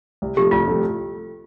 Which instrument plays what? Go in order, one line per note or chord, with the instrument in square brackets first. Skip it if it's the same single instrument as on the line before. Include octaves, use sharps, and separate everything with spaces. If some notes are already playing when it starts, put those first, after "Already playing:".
[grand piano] C2
[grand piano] C3 F3 A3 [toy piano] G4
[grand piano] C2 [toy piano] F4
[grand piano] C3 F3 A3